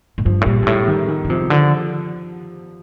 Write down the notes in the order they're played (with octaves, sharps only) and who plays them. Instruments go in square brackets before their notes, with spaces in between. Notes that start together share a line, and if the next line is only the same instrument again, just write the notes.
[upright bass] A2
[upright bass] G2 [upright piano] F3
[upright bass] A2
[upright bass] A#2 [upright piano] G3
[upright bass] G2
[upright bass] A2 [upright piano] G3
[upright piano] D#3
D#3
[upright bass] D3
[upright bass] C3 [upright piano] F3
[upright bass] D3 [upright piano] F3